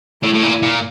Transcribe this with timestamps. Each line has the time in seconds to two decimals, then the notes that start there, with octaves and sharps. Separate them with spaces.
0.23 A2 E4
0.34 A2
0.42 A#2
0.62 A#2